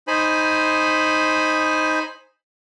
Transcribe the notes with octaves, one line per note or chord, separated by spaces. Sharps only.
D#4 C5 G#5 B5